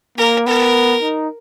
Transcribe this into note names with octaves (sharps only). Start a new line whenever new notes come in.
A#3 A#4
B3 A#4
D#4